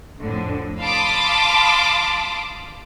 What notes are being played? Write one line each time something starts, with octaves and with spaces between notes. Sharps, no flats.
F2 A2 D3
F5 A5 B5 C6 D6 D#6